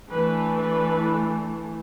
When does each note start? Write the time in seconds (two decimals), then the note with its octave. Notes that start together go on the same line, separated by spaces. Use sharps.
0.11 E3 A3 D4 B4
0.59 B4